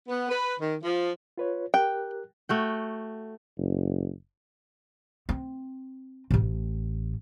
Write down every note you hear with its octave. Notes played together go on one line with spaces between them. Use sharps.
B3
B4
D#3
F3
F4 B4 C#5
G4 A#4 G5 F#6
A3 F#4 G5
F#1
C4
A1 A2